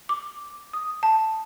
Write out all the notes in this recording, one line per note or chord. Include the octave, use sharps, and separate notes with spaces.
D6
D#6
A5